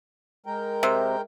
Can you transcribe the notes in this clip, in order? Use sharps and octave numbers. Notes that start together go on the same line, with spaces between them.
G#3 A#4 G5
C3